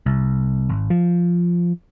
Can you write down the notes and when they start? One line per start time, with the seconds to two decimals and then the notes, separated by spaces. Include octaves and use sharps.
0.06 C2
0.69 G#1
0.90 F3